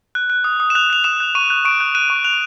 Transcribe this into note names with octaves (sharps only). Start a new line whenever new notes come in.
F#6
F#6
D#6
D#6
E7
F#6 F7
F#6 F7
D#6 E7
F#6
C#6 D#7
F#6
C#6 D7
F#6
F#6 D#7
C#6
F#6 F7